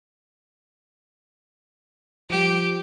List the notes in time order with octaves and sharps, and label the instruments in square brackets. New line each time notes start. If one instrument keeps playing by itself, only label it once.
[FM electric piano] F3 G3 [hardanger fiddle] G4